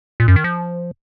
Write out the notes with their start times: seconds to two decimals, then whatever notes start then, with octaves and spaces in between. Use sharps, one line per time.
0.20 A#2
0.28 F#2
0.36 D#3
0.44 F3